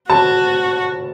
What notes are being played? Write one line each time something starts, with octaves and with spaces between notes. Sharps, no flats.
F#4 A5